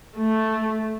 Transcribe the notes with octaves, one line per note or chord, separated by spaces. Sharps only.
A3